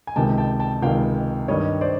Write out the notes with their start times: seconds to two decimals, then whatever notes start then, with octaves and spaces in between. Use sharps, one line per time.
0.07 G#5
0.16 C#2 C3 D#3 G#3 G5 A5
0.38 G5 A5
0.60 G5 A5
0.82 C#2 C3 D#3 G#3 F5 G5
1.48 G2 D#3 G3 C#5 D#5
1.81 C5 D5